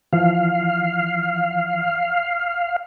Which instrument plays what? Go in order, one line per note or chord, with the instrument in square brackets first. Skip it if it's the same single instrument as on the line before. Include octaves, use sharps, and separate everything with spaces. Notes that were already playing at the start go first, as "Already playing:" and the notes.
[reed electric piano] E3 F3 [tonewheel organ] F5